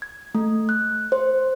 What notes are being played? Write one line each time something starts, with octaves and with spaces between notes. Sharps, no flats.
G#6
A3
F#6
C5